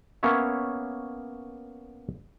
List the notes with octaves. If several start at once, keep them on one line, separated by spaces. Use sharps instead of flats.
A#3 B3 C#4 C#5 E5